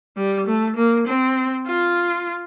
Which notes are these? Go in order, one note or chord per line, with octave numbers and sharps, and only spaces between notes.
G3
A3
A#3
C4
F4